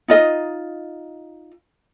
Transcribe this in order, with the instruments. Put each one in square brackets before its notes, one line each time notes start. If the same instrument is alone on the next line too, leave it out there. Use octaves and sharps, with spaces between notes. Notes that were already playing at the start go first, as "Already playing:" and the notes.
[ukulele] D#4 F4 D#5